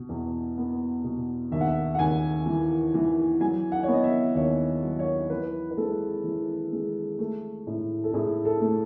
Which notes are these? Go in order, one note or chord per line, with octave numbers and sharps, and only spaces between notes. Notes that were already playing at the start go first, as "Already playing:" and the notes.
Already playing: B2
E2
B3
B2
D#2 E5
F#5
E5
F#5
D#2 G#5
E3
E3
F#3 G#5
F#5
C#5
B3
D#5
E5
D#2 C#5
F#3
C#5
E3 B4
B4
G#3 A4
E3
G#3
A3
A2
A4
A2 G#4
A4
A3